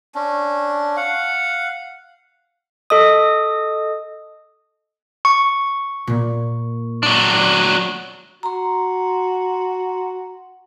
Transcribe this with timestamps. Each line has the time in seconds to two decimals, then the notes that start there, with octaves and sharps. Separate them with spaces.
0.15 C#4 D4
0.97 F5 F#5
2.90 A4 D#5 D#6
5.25 C#6
6.07 A#2 A#3
7.03 F#3 D4
8.43 F#4 A#5 C6